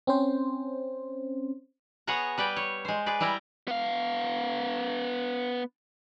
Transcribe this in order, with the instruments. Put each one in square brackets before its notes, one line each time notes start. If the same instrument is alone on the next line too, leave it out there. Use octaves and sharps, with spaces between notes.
[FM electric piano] C4 C#4 C5
[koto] B3 G#4 C#5 F#5 A#5
G3 B4 D5 G5
C#5
G#3 C5
G#4 B4 D5
G3 E4 D5 G5 A#5
[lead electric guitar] B3 F5